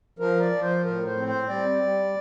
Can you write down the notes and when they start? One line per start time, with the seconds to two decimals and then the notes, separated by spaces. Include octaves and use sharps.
0.19 F3 A#4
0.41 D5
0.52 F3
0.62 C5
0.84 A2 A#4
1.06 C5
1.17 C4
1.28 C5
1.49 G3 D5
1.82 G3